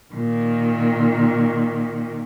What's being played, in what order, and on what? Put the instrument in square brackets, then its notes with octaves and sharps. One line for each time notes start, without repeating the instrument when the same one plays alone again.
[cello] A#2 D#3